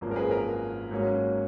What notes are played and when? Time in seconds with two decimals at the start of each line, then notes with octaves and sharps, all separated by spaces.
0.01 G#1 F#2 F3 A#3
0.11 A#4
0.16 G#4 B4
0.31 A#4
0.91 G#2 F#3 A#3 C#4